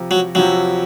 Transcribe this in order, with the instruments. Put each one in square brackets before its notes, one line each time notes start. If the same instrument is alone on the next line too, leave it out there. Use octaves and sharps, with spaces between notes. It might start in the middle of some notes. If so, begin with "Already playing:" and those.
Already playing: [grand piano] F2 C3 F3
[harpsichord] F#3
[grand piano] F2 C3 F3 [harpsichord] F#3